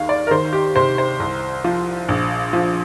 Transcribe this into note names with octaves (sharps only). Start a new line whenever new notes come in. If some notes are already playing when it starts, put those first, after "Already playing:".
Already playing: D#2 D#3 F5
D5
A#4
D#3 C5
G4
C3 C5
C5
C2
F3
A#1
F3